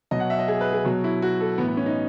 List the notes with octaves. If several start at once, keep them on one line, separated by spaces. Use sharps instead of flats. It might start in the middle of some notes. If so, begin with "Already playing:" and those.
B2 F#3 D#5
F#5
E5
D#5
G#4
B4
G#4
B2 F#3 F#4
E4
F#4
A4
A2 E3 B3
B3
C#4
D#4